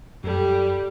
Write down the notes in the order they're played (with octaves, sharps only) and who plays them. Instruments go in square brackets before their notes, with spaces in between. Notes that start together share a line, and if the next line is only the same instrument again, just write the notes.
[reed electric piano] F#2 A4 [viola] G3